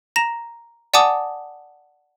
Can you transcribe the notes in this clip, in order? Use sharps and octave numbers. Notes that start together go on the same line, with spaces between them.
A#5 A#6 E7
D5 F#5 G#5 A5 D6 D#6